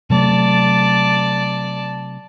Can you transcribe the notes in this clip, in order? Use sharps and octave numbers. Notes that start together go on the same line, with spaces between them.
C3 F#3 A3 D5 A5